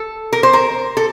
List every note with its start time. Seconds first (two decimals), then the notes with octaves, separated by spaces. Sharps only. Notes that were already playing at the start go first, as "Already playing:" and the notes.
Already playing: A4
0.33 A#4
0.43 C5
0.53 A#4
0.97 A4